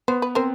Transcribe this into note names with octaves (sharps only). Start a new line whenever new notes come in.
B3 C5
B4
C4 A#4 C5